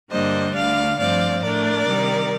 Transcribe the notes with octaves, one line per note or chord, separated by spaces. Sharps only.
G2 D3 G3 A#3 D4 C5 D#5
D2 D3 A3 D5 F5
G2 F3 A3 C4 D5 F5
A2 A3 D4 A#4 D5
C3 D#3 G3